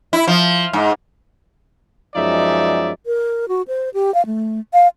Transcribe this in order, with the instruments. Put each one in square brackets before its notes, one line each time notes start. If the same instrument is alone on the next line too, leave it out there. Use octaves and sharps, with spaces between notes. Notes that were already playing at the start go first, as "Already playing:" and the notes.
[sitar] E4
F3
G#2
[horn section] F#2 F3 G#3 D#4 D5 E5
[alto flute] A#4
F#4
C5
G4
F5
A3
F5